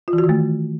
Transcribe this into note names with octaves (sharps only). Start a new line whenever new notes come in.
F4
E3
F#4
D#3
A3